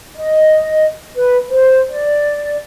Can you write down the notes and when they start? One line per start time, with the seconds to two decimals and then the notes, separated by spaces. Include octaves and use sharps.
0.16 D#5
1.15 B4
1.49 C5
1.92 D5